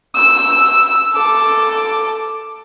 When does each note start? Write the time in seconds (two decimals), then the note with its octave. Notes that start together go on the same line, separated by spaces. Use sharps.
0.15 E6
1.14 A4 D6